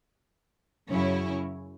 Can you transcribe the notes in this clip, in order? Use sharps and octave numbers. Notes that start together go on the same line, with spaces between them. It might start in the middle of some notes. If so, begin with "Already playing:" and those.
F#2 C#3 F#3 C#4 E4